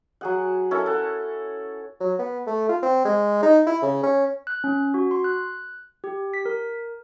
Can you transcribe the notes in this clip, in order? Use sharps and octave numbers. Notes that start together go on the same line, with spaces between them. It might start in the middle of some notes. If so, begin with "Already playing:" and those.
F#3 G#4 F#5
C#4 E4 A4 A#4
A4 F#5
F#3
B3
A3
F4
C4
G#3
D#4
E4
C#3
C#4
F#6
C#4
F#4
C6
F#6
G4
B6
A#4